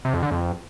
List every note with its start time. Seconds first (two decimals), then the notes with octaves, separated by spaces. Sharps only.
0.05 C3
0.14 F2
0.23 D3
0.31 F2